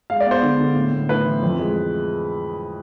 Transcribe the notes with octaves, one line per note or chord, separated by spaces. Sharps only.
G#3 F5
D5
B3
C5
D3
D3
A2
A2
A2 B4
E3
F2
G#3
G#3